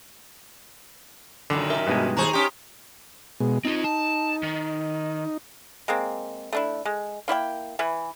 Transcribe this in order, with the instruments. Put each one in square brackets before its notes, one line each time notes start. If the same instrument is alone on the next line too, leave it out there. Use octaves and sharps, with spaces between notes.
[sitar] F#2 A#2 D#3 [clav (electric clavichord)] D3
[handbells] A#4 E5
[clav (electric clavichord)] G2 B2 G#3
[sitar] D#2 G#4 C5 [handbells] A#5 C#6
[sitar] C#4 G4 [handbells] C6 D#6
[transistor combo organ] B2 G#3
[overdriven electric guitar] C4 F4 [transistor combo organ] D#4
[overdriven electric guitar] A5
D#3
[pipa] G#3 A#3 C4
A3 D4 E4
G#3
A#3 E4 C#5 G5
E3 E4 B4